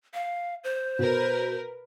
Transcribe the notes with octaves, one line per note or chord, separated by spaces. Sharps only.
F5
C5
B2 A#4 B4